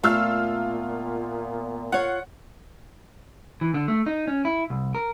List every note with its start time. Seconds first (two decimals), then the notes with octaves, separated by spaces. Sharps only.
0.04 A#2 A3 B3 F4 F5 E6 F6
1.92 F4 C#5 F#5
3.61 E3
3.74 D3
3.88 A3
4.06 D#4
4.27 C#4
4.45 E4
4.70 C2
4.95 A#4